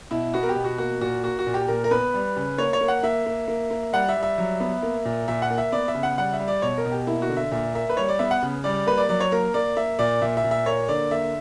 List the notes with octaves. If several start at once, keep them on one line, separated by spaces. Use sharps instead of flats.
B2 E4
B3 F#4
A#4
G4
B2
F#4
A#3 F#4
A#2 F#4
A#3 F#4
F#4
A#2
G4
A#2 A#4
A#4
B3 B4
G3
C#3
A#3 C#5
C#5
A#3
F#5
A#3 E5
A#3
A#3
A#3
G3 F#5
E5
G3
E5
F#3
B3
A#3
A#2
A#2 E5
F#5
A#3
E5
B3 D5
E5
C#3
F#5
G3 F#5
E5
G3
D5
B2 C#5
A#4
B2
G4
A#3 E4
F#4
D3
E5
A#2 E5
A#3 E5
B4
G3 C#5
D5
B3 E5
F#5
C#3
G3 D5
A#3 B4
D5
F#3 D5
C#5
A#3 A#4
A#3 D5
A#3 E5
A#2 D5
A#2 E5
E5
A#2
E5
A#3 C#5
D3 D5
A#3 E5